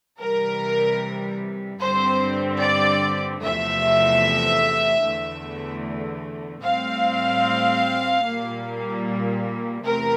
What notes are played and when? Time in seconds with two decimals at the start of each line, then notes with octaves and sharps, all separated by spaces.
0.18 C3 E3 G3 A#4
1.80 G2 D3 G3 C4 C5
2.61 D5
3.40 E2 C3 F3 A3 E5
5.02 E2 D3 A3
6.63 A2 G3 C4 F5
8.24 A#2 G3 A#3
9.85 E2 C3 E3 A3 C4 A#4